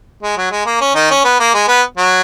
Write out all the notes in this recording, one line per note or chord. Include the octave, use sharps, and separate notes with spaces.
G#3
F#3
G#3
A#3
C#4
D#3 D#4
C#4
B3
A#3
G#3
B3
F#3